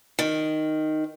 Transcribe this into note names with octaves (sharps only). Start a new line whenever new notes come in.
D#3